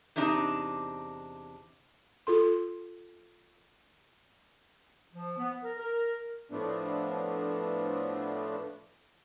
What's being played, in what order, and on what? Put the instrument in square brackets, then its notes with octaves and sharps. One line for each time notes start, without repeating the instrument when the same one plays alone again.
[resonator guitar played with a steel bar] E2 C3 D4 D#4 A#5
[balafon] F4 A4 C6
[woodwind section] F3
B3
A#4
A#4
[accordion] A2 F3 A3 B3 D4